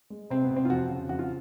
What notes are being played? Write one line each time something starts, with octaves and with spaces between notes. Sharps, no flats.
G#3
C3 C4
B3
C3
C4
F4
F2 F#4
C#3
F2 F#4
F4